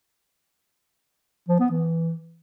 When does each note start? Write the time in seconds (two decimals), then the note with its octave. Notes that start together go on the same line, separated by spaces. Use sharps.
1.48 F3
1.60 B3
1.71 E3